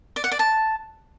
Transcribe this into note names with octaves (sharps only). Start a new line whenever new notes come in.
D5
F#5
D5
A5